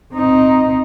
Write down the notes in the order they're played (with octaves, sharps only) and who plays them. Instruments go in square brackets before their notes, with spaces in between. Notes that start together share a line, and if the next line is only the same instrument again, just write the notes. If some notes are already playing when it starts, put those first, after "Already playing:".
[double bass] C4 D#4